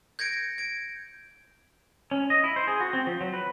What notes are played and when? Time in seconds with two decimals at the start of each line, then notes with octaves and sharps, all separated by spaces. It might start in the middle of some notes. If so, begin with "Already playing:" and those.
0.19 G6 G#6 A#6 C#7 D7
0.58 G#6 D7
2.11 C#4
2.30 D#5
2.44 E4
2.56 C5
2.67 G#4
2.80 F#4
2.93 C4
3.07 F3
3.21 F#3
3.34 B4